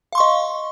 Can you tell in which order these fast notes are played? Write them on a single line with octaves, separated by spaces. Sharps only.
F5 C6 C#6 D#5